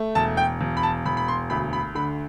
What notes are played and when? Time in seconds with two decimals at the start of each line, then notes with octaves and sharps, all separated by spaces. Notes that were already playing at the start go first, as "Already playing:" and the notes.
Already playing: A3
0.15 E1 A5
0.37 G5
0.61 E1
0.77 B5
0.83 A5
1.05 E1 B5
1.17 B5
1.28 C6
1.50 D2 B5
1.73 B5
1.95 D3 B5